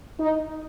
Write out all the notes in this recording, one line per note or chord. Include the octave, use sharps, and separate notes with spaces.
D#4